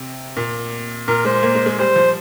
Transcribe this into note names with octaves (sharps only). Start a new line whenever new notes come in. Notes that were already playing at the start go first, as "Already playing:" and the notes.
Already playing: C3
A#2
A#2 A#4
G#3 C5
A#3
G#3
G#3
G3 C5
F3